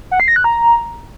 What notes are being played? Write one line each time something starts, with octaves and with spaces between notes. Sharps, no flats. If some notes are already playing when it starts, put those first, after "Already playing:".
F#5
C7
A#6
F#6
A#5